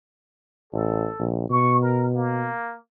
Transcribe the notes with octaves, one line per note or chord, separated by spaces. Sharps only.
A1 A4
A#1
B2 C#6
A#4
A#3